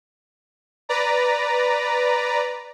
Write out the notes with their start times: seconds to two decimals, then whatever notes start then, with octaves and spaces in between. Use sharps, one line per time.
0.89 B4 D5 A#5